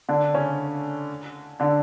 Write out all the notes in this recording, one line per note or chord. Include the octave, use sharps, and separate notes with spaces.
D3 D4
C#3 C#4
D3 D4